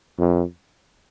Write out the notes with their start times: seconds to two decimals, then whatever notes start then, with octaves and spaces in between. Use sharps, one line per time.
0.18 F2